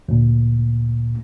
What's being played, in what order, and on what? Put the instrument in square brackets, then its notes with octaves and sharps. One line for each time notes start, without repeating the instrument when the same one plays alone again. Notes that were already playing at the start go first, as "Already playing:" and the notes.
[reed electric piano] D2 A#2